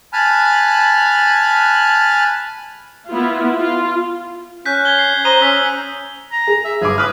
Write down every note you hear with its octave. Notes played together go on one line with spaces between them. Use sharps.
G#5 A5 B5 F6 F#6
B3 E4 F4
F4
C#4 F#6 G6 B6
G#6 G7
C7
C5 A#5 D#6 D#7 G7
C#4 E6 B6
A#5
G#4
E5
G1 G#4 D6
B4 D#6 F6